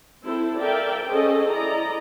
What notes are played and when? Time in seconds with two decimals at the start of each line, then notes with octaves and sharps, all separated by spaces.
0.23 C4 E4 A4 C5
0.59 A4 A#4 D5 E5 F5 G5
1.06 C#4 G#4 A4 C5 D#5
1.48 E4 D5 D#5 A#5